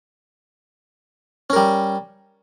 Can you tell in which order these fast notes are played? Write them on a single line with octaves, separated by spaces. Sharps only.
C#4 A#4 G3